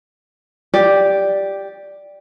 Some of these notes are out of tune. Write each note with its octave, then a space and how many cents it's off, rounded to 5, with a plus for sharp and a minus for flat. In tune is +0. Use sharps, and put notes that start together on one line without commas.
G4 +0 D5 +0